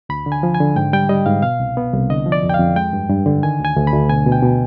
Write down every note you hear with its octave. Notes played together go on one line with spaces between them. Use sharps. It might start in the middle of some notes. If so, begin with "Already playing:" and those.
D2 B5
D3
G#5
F3
G#5
D3
G#2 G5
G3 G5
G3 D#5
G#2 F5
B2 F5
C2
B3
C2
D3 D#5
F3
D5
F2
G5
F2 F5
G#3 G5
G2
G2
D3
D#3 G#5
D2 G#5
D2
B5
D2
B2 G#5
B2
G5
B2